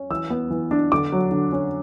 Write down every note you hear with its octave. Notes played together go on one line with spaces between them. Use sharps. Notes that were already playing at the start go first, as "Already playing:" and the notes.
Already playing: C#4
E3 E6
B3
E3
D4
D3 D6
F#3
D3
C#4